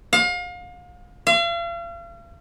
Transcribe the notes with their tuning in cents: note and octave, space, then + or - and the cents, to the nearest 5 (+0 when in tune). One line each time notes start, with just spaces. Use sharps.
F5 +35
F5 -40